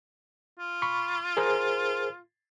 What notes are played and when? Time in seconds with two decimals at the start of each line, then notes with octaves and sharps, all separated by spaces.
0.59 F4
0.82 B5 C#6
1.37 G#4 A#4 C5